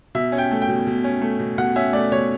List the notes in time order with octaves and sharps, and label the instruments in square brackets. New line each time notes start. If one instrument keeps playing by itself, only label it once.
[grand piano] B2 E5
C#4
G5
A3
G5
B2
B2
C#4
A3
B2
B2 F#5
C#4 E5
A3 D5
B2 C#5